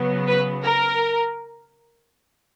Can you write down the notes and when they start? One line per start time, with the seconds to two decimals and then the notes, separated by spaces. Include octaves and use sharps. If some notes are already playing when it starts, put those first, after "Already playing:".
Already playing: C#3 F#3 B3
0.28 B4
0.64 A#4